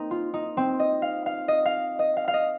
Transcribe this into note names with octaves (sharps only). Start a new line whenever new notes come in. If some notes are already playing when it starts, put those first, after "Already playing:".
Already playing: A#3 C4 D#4
F4
D#4
C4
D#5
F5
F5
D#5
F5
D#5
F5
F5
D#5